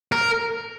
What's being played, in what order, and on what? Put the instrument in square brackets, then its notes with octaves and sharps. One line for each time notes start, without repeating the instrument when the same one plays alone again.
[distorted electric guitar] A#4